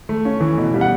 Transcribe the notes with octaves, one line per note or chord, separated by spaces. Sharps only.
A3
C#4
E3
B2
G3
F#5